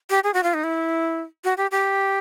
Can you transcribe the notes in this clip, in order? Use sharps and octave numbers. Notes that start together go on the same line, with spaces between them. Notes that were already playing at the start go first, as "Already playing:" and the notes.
G4
G#4
F#4
F4
D#4
E4
F#4
G4
G4